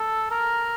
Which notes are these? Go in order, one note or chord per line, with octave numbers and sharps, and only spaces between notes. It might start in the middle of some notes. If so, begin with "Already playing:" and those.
Already playing: A4
A#4